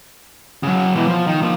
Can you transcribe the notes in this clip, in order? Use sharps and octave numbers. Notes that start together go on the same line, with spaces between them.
C#3 F#3
B2 E3
F3
D#3
F3 A#3